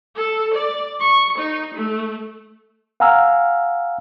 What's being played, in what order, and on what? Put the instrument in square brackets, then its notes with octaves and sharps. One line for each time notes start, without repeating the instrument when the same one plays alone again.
[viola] A4
D5
C#6
D#4
A3
[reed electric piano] F5 F#5 G#5 A#5 E6 F6